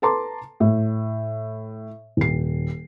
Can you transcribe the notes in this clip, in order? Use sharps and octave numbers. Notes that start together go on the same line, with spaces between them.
A4 B4 A5 A#5 C6 D6
A2
D#1 C7